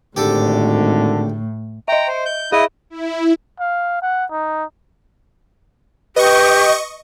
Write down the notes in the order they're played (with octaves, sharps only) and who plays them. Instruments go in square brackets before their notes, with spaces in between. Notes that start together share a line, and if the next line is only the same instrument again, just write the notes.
[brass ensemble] G#1 [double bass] A2 [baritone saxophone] D3 [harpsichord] G4 A4
[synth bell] D#5 E5 [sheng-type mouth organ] G5 A#5
[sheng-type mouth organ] C5
G6
[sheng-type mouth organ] E4 D#5 D#6 [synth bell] G#4 E5
[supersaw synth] E4
[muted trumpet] F5
F#5
D#4
[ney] G4 [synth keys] B4 [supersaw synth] D#5 C#6